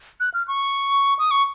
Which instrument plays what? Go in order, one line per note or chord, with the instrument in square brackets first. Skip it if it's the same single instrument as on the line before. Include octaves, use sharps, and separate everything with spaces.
[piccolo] F#6
F6
C#6
D#6
C#6